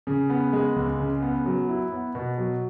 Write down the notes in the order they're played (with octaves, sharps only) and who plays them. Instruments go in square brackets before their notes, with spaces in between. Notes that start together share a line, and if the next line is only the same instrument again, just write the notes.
[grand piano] C#3
B3
G#3
C#2
C#3
B3
F#3
E4
B3
B2
F#3